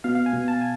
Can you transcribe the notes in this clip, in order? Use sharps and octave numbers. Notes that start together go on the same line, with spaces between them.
B2 F5
F5
G#5
B2
A5
G#5